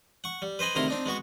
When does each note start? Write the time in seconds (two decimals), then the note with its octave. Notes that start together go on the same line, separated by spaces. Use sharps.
0.24 F#5 C#6
0.42 G3
0.59 B4 C5 D#5 G#5 B5
0.75 D2 C3 D#3 E4 A#5 C6
0.88 C4 D4 D#4
1.06 G#3 B3 F#4 C#6